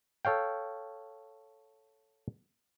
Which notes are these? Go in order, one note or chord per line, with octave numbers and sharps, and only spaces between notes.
A4 C#5 F5 G5